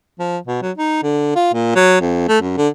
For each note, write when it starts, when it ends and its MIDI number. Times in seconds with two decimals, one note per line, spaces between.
0.20 0.38 53
0.47 0.59 47
0.62 0.72 54
0.78 1.03 63
1.03 1.35 50
1.36 1.51 65
1.54 1.73 46
1.76 2.00 54
2.01 2.28 41
2.28 2.41 57
2.41 2.57 42
2.58 2.69 50